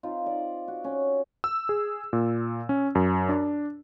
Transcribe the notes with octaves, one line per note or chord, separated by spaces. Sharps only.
C4 D#4 F4
D5
F#4
C#4
E6
G#4
A#2
C#4
F#2
D4